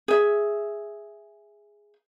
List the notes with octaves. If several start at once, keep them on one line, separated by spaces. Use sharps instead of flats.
G#4 E5